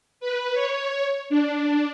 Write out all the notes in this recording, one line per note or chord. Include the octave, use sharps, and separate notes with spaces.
B4
C#5
D4